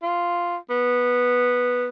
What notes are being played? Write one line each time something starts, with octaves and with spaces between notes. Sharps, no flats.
F4
B3